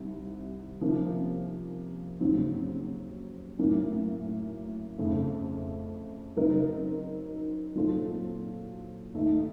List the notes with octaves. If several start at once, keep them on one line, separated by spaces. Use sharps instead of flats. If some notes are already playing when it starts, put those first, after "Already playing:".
Already playing: C2 C3 D#3
C3 F3 A#3 C#4
D#2 C#3 F#3 C4
A2 F#3 A#3 C#4
F2 C#3 A3
C#3 F#3 C4 D#4 A#4
A#2 F#3 C4 F4 A4
D#2 D#3 A3 D#4